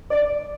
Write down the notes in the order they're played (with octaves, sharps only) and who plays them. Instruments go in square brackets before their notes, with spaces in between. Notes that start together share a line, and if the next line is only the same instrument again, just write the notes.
[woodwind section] D5